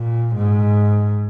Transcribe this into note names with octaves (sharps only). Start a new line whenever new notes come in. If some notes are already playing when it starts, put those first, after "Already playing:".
Already playing: A#2
G#2